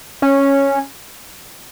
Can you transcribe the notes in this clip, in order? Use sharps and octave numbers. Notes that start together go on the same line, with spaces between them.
C#4